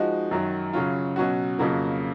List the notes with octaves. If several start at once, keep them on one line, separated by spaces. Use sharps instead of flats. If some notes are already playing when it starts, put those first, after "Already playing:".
Already playing: F3 G#3 D#4 F#4
F#2 D#3 F#3
C#3 F#3 C#4 F4
B2 F#3 C#4 F#4
F2 C#3 F#3 A#3